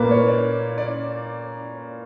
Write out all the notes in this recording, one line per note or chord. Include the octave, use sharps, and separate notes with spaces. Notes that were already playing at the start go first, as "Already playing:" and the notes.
Already playing: A#2 A#3 B4
C#5
D5
D5